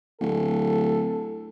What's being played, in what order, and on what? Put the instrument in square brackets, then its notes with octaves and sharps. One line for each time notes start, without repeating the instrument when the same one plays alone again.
[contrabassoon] D1 [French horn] A4